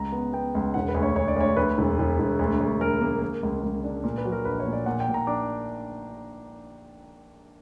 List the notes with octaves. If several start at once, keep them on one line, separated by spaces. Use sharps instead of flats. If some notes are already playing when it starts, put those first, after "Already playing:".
Already playing: C#2 A#5
B3
B3 G5
C#2
E1 F#5
B4
D2
C#5
D2 C#5
D5
D2 C#5
D2 B4
E1
E1
E1
D2
D2
D2 A#4
A#3
A#3
C#2
C#2
D4
A#2 A#4
B4
F#3
A#4
A#1 B4
C#5
A#2
D5
A#2 F#5
G5
A#2
A#5
D4 D6